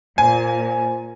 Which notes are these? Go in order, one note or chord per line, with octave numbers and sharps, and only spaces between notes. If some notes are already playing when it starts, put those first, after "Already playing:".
A#2 C5 G#5